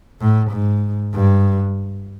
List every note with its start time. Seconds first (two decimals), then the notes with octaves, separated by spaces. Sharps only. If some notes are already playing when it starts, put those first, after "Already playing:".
0.21 A2
0.51 G#2
1.13 G2